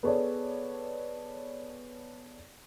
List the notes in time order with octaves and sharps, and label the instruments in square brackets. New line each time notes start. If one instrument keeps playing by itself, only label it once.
[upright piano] B3 G#4 A4 C#5 D5